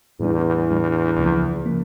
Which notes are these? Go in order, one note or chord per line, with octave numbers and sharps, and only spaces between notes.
E2 A2 G3 D4
A2 G3 D4
C#2 C#3 F3 A#3
C#3 F3 A#3